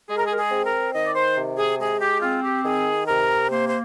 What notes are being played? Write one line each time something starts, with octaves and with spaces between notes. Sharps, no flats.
G#3 G#4
A#4
G#4
A#4
G#4
C4
A#4
D#3 D#5
D5
C5
C3
G#4
G#3 G#4
G4
C4 F4
G4
D#3 G#4
C3 A#4
A#3 C5
C5